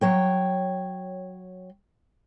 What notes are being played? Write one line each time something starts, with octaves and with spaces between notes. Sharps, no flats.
F#3 C#5 G5